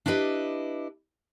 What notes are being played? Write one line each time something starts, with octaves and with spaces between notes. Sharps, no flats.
D4 E4 G4 B4 D#5